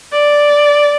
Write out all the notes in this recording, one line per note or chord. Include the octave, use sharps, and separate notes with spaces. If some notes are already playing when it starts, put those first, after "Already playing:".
D5